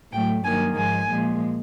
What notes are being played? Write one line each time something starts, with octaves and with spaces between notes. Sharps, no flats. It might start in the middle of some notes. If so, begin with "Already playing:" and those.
A2 F#3 A3 G5
G2 D#3 F#3 A#3 G#5
G#2 F3 G#3 G#5
A#2 F3 G#3